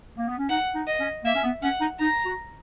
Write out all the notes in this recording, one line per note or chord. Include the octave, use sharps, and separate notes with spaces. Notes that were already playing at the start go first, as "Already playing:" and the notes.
A#3
B3
C#4
D#4 F#5
D#4
D#5
C#4
A#3 E5
C#4
B3
C#4 F#5
D#4
D#4 A#5
F#4